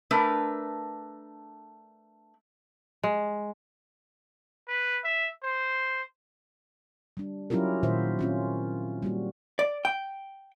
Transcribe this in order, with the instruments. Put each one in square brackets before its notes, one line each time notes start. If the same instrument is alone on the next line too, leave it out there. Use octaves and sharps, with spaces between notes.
[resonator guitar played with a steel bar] A3 D4 A#4 B4
[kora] G#3
[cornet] B4
E5
C5
[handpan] G3 D4
F#3 C#4 E4 F4 G4 A#4
A#2 D#3 F4 F#4 C5 E5
C4 C#4 F4
G3 A#3 F#4
[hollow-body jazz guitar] D5
G5